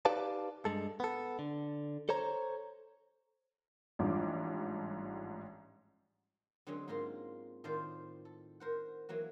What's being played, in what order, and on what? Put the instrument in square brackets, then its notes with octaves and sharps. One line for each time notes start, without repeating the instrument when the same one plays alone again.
[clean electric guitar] D#4 G4 B4 D5 F5 A5
G2 G#3 A4
B3 A4
D3
A4 C5 C#5 A#5
[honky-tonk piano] A1 G#2 F3 G3 D4 D6
[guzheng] D3 F#3 G#3 C4 C#4 G#4
G#2 A#3 F4 A#4 C6
A2 D#3 F4 C5 D5 F5
A4
A#4 C5 F#5
E3 F#3 A#3 F#4